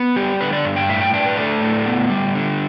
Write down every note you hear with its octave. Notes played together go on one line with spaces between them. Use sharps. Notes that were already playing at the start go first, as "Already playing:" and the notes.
Already playing: B3
G3 G4
D3 B4
D5
G2
G5
A2 E5
G5
D4 G5
B4
A3 D5
A2
B3
G3
D3